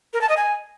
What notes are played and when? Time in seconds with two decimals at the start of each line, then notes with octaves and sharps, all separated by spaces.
0.14 A#4
0.21 A5
0.29 D#5
0.37 G#5